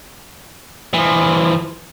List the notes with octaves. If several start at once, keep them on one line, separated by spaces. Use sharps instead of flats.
E3 F3